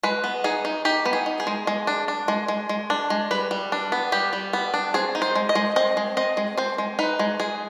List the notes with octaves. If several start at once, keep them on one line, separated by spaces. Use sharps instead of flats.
G#3 B4
B3
D#4 G#4
D#4
D#4 G4
B3
G#4
D#4
G#4
G#3
G#3
D4
D4
G#3
G#3
G#3
D4
G#3
G3 B4
G3
D4
B3
G3 G4
G3
B3
D4
C4 G#4
D#4
C5
G#3
D#5
G#3
C4 D#5
G#3
C4 D#5
G#3
C4 C5
G#3
D#4 B4
G#3
G#3 G#4